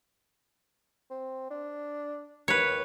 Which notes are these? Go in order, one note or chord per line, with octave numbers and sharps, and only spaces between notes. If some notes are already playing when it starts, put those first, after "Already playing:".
C4
D4
D#2 B4 C#5